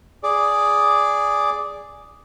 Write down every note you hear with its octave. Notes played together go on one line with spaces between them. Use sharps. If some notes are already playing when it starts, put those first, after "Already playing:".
G#4 D5